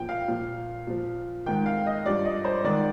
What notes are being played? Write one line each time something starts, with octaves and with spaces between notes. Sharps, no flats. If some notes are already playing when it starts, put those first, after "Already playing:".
Already playing: A#2 F3 G5
F5
A#2 F3
A#2 F3
G#2 D#3 G5
F5
D#5
G2 F3 D5
D#5
C5
G#2 D#3 D5